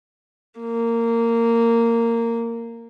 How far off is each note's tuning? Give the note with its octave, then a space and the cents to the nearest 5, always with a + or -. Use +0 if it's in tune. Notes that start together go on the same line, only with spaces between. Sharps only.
A#3 -15